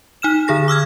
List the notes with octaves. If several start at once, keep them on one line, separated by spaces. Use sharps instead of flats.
D#4 F6 E7
D3 G#4 A#6
D6 E6 F6 G#6